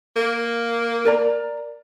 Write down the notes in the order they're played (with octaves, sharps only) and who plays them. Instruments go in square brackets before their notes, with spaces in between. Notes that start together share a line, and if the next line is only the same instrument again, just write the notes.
[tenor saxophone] A#3
[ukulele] A#4 D5 A#5